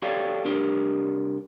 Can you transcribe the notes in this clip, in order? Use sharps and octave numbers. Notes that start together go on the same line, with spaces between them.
F#4 G4 A4 C#5 D5 F5
C2 D4 G4 A#4